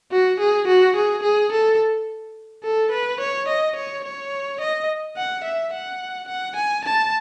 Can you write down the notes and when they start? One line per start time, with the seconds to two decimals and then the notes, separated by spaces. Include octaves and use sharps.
0.12 F#4
0.40 G#4
0.67 F#4
0.96 G#4
1.23 G#4
1.52 A4
2.63 A4
2.91 B4
3.20 C#5
3.48 D#5
3.76 C#5
4.04 C#5
4.61 D#5
5.17 F#5
5.44 E5
5.73 F#5
6.28 F#5
6.56 G#5
6.85 A5